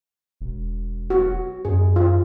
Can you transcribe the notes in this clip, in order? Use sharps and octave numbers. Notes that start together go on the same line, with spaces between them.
E1
F#4
F#2 G#4
F4